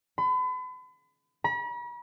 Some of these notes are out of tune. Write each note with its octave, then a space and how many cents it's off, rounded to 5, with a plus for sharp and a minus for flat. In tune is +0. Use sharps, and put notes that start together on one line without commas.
B5 +40
B5 -45